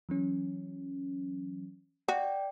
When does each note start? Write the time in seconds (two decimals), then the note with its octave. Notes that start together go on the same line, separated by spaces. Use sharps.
0.09 E3 F#3 C#4
2.08 F#4 D5 G5